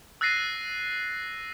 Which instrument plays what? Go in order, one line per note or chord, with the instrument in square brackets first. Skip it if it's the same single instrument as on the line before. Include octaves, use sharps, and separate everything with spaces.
[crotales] E6 F#6 A6 A#6 C7 D#7